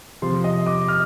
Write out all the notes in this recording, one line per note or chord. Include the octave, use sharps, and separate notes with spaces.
C3 F3 C6
D#5
D6
F6